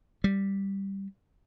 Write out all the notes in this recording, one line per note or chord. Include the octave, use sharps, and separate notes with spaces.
G3